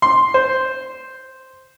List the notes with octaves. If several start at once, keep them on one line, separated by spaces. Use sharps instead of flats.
C6
C5